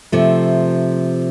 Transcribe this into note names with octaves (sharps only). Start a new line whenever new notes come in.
C3 F3 A3